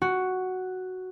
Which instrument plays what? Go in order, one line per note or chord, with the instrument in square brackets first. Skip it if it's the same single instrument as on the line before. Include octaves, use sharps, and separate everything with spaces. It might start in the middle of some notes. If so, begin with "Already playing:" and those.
[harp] F#4